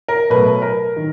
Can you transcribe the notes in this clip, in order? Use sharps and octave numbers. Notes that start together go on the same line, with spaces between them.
A#4
B2 F#3 A3 B4
A#4
D#3